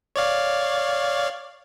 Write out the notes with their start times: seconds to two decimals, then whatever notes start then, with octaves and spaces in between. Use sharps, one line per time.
0.16 C#5 D5 F5